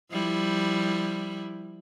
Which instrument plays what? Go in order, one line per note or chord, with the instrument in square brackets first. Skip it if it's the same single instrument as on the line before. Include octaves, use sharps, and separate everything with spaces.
[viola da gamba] F3 G3 E4